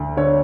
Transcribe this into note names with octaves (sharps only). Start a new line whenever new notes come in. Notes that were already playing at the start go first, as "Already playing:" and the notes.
Already playing: D2
D3 C#5